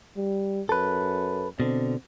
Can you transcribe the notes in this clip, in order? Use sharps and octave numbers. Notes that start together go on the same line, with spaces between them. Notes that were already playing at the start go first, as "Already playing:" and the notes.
G3
F#2 A4 B4
B2 D3 C4